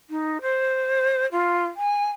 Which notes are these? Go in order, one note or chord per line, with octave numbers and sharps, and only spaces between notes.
D#4
C5
F4
G#5